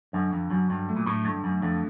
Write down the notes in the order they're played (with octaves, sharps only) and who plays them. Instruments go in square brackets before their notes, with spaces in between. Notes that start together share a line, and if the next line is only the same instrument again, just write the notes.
[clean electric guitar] F#2 [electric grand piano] D3
[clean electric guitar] F2
[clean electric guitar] F#2 [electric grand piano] F#3
[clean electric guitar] G2
[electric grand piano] A3
[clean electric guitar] A#2
A2
[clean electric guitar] G2 [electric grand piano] D3
[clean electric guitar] F#2
[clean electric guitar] F2 [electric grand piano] D3